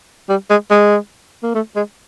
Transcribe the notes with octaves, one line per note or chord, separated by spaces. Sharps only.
G3
G#3
G#3
A#3
A3
G#3